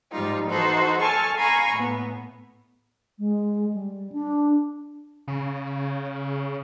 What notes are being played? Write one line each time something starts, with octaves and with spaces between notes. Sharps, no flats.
G#2 F3 G3 D#4 F4
E3 D#4 F#4 A4 C5
A4 G#5 A5 C#6 F6
F5 G#5 A#5 B5 C#6
A2 B3
G#3
G3
D4
C#3